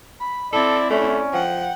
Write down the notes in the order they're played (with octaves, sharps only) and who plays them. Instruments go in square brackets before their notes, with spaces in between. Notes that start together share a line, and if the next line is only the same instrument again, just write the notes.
[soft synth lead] B5
[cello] C4 E4 [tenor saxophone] A4 [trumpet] D5 [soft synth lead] A5
[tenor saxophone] A3 [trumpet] C#4 [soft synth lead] D5
[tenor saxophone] F3 [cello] F#5 [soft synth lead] G5